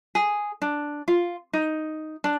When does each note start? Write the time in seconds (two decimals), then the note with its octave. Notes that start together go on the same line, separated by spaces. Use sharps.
0.15 G#4
0.62 D4
1.08 F4
1.53 D#4
2.24 D4